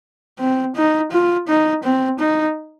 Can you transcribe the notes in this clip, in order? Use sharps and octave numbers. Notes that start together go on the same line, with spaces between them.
C4
D#4
F4
D#4
C4
D#4